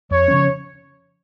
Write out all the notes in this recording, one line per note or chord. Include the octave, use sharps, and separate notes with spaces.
F2 C#5
C#3 F3 C#4